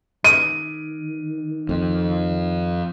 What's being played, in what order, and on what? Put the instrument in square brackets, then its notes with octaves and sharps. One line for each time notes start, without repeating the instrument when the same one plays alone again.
[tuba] D#3 [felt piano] D#7
[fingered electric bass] F2